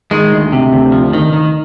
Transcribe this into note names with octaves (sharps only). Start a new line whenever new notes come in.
D#3 G#3
D2
C3
D2
F3
D#3
D#3